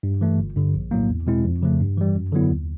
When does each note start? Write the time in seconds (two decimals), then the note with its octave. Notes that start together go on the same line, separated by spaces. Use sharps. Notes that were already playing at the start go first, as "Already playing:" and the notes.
0.03 G2
0.21 E3 A3
0.39 G1
0.56 G2 D3
0.74 A#1
0.91 A2 F#3 A#3
1.09 E2
1.27 B2 G#3 C4 E4
1.45 F2
1.62 C#3 F3 A3
1.80 G2
1.97 E3 G3
2.15 F#2
2.33 D3 F#3 B3 E4
2.51 D#2